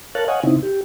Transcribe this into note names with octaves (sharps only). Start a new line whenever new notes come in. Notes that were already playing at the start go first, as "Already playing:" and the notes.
A#4 C#5 F5 A5 F#6
C#5 D#5 F5 F#5 G#5
C#3 C4 D#4 E4
G4